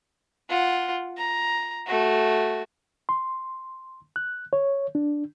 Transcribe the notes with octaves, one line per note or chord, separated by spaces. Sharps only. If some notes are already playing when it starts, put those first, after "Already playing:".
F4 F#5
A#5
A3 F#4
C6
F#6
C#5
D4